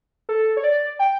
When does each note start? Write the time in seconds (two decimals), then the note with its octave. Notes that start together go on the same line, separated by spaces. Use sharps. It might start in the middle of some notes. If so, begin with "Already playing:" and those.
0.29 A4
0.57 C#5
0.64 D5
0.99 G5